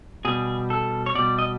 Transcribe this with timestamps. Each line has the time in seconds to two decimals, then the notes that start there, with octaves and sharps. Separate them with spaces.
0.25 B2 G3 G#4
0.70 A4
1.06 C#5
1.15 B2 G3 D5
1.39 D#5